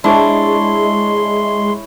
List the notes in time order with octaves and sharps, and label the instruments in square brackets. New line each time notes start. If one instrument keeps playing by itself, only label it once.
[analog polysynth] G#3 [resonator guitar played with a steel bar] D4 [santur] E4 C#5 [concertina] C6